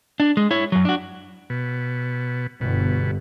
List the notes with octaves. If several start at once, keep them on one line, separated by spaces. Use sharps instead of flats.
D4
G#3
E4 C#5
F#2 F#3
D4 F#4
B2
G1 B2